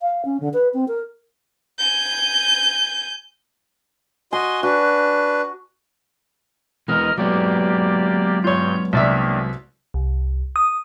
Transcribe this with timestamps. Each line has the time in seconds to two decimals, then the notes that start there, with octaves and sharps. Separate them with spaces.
0.01 F5
0.25 C#4
0.40 D3
0.54 B4
0.74 C4
0.88 A#4
1.78 G#5 G6
4.33 F#4 D#5 G#5 C6
4.63 D4 F#4 B4
6.88 E3 G#3 B3 A#4 D#5 F6
7.18 F#3 G#3 A#3 B3 G4 D5
8.44 G2 F4 C#5 G6
8.93 C2 D#3 A#3 D4 D5 E5
9.94 C2
10.56 D#6